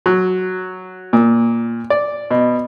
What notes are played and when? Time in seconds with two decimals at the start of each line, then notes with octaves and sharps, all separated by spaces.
0.06 F#3
1.13 A#2
1.90 D5
2.31 B2